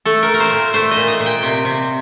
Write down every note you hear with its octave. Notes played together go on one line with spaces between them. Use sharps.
A3 A4
A#4
A3
A#4
C5
A#2
A3 C5
D#5
A#2
D#5
A#2
G5
C3
C3